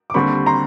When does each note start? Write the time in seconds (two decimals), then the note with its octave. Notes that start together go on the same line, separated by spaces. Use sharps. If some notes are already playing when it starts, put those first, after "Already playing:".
0.10 D6
0.14 D#2 D3 G3 C4 B5 C#6
0.46 A#5 C6